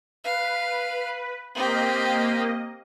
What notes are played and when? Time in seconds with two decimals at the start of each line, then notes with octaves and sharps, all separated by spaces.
0.24 B4 F5
1.55 A#3 C4 G4 D#5